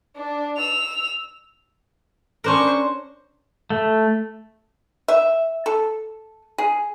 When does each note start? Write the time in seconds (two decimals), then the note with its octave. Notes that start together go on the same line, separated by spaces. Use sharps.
0.16 D4
0.57 E6 F7
2.44 C#4 D4 A#4 C5 C#6
3.70 A3
5.08 E5
5.66 A4
6.58 G#4